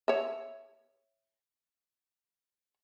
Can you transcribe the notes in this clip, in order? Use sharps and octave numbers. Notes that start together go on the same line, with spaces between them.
C#5 E5